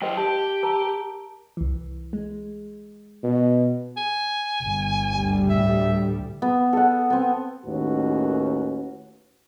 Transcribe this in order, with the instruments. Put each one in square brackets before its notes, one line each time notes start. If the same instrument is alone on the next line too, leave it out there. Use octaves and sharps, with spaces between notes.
[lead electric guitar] F#3 C5 [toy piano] A#4 D#5 G5
[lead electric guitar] G4 [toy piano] A5
[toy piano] A#4 A5 A#5
[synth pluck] C2 E3
G#3
[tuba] B2
[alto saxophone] G#5
[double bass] G1
[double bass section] D2 G3
[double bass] A2 [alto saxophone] E5
[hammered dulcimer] B3
A4 F#5
B3 C4
[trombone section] D#2 A2 D#3 C#4 F#4 B4